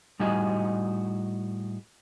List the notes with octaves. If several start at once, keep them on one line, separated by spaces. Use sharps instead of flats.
A2 G3 D#4 F#4 G#4 D#5